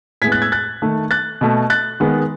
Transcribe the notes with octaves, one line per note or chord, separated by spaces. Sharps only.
A2 G#3 B3 G#6 B6
F#6 A6
E6 G#6
F#6 A6
D#3 A3
F#6 A6
B2 A3
F#6 A6
D#3 G#3 B3